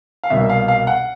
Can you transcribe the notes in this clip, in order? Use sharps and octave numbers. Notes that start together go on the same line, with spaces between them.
F5
C2 B2 G3 A#3 E5
F5
F5
F#5